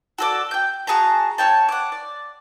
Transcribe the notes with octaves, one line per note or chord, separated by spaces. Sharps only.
F#4 A4 D5
G5 G6
F#4 G#4 A5 A#5
C#4 C#5 G5 A5
F#5 D6
D5